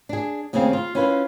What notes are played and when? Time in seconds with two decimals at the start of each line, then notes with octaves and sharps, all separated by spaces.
0.09 D4 G#4
0.53 D#2 C#3 A3 C4 G#4 F5
0.73 F4
0.95 C#4 E4 F4 B4 F5